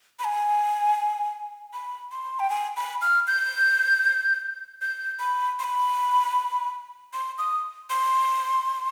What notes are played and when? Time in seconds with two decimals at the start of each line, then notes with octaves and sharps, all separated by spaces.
0.19 B5
0.24 G#5
1.73 B5
2.12 C6
2.39 G5
2.50 G#5
2.77 B5
3.02 F6
3.27 G6
4.82 G6
5.19 B5
5.59 C6
5.64 B5
7.13 C6
7.38 D#6
7.90 C6